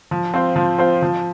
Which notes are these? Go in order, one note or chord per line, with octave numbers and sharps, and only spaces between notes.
F3
C4 F4 C5
F3
C4 F4 C5
F3